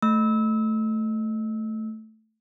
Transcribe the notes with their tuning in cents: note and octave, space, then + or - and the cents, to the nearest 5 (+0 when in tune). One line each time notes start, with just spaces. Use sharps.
A3 +0 E6 -25